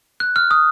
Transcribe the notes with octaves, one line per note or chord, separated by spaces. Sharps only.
F#6
F6
D#6